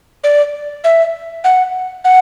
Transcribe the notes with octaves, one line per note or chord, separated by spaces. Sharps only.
D5
E5
F#5
F#5